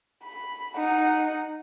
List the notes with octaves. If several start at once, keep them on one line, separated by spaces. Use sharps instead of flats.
B5
D#4 F#5